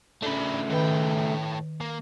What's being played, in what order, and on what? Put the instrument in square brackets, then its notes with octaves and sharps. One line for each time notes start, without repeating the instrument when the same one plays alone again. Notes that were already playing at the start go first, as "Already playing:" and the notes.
[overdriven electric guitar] C#3 A3 [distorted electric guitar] D4 B5
[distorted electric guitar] A2 G5 [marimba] D#3 B4 B5
[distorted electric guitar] A#3